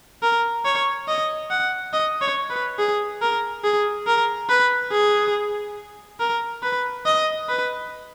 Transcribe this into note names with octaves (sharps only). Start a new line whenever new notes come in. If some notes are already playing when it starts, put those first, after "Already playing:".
A#4
C#5
D#5
F#5
D#5
C#5
B4
G#4
A#4
G#4
A#4
B4
G#4
A#4
B4
D#5
B4